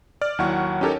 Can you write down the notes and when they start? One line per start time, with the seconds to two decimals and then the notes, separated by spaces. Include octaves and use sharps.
0.21 D5 F6
0.39 D#2 F#3 E4 F#5 C#6
0.81 C#4 D#4 G4 A4 A#4 C#5